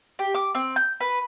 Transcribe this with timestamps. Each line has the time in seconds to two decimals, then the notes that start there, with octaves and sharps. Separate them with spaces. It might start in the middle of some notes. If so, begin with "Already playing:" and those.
0.19 G4
0.35 D6
0.55 C4
0.76 G6
1.00 B4